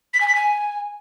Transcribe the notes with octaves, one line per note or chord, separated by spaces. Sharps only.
B6
G#5
B6
G#5